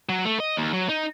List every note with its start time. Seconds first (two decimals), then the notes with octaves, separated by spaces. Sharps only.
0.09 F#3
0.25 A3
0.40 D#5
0.57 D#2
0.73 F#3
0.89 D#4